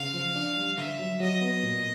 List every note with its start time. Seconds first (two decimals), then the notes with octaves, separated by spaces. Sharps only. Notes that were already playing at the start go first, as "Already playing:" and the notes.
Already playing: C#3 F5
0.14 F3
0.35 D4
0.57 G3
0.78 D3 E5
0.99 F#3
1.20 F#3 D#5
1.41 B3
1.63 A#2